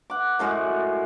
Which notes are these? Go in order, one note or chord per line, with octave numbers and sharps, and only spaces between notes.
F#5 D6
F#2 A2 G#3 F#4